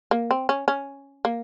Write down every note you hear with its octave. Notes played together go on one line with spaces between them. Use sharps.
A#3
C4
C#4
C#4
A#3